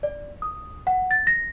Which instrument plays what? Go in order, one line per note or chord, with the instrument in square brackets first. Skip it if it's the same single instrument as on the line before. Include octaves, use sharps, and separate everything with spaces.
[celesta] D5
D#6
F#5
A6
A#6